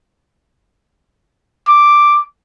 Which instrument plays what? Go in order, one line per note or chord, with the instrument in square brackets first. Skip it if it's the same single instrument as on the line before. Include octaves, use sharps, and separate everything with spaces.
[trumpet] D6